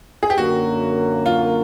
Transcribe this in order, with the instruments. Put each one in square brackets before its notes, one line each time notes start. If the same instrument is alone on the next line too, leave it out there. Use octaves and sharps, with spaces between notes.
[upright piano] G#4
G4
[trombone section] F#2 D3 F#3 A#3 [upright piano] F#4
[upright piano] F4